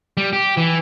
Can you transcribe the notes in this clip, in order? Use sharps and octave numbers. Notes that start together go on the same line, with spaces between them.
G3
G4
E3